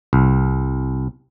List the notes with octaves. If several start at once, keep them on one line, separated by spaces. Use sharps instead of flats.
C2